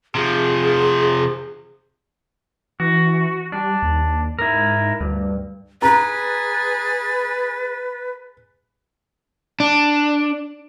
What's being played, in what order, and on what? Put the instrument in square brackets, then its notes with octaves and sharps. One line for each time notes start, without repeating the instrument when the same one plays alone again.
[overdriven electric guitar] C3 F3 [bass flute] G#4
[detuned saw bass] E3 [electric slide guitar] F#4
[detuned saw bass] G3 [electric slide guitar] D4
[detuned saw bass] D#2
[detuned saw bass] G#2 [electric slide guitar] E4 A#4
[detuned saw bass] D2 [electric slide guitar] G2
[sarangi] G#4 [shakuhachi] B4 [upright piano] A#5 [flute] A6
[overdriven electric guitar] D4